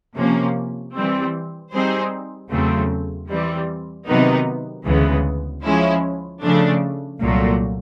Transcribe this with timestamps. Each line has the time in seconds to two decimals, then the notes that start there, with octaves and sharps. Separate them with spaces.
0.16 C3 F3 A#3 C#4
0.94 E3 G3 C4
1.73 G3 C4 D#4 G#4 C5
2.51 E2 C#3 F#3 A3 C4
3.29 E3 G3 C4
4.07 C3 D#3 F#3 B3 D#4
4.85 D2 C#3 E3 G#3 B3
5.64 F3 G#3 C#4 E4
6.42 C#3 F3 A3 D4
7.20 C2 A#2 F#3 A3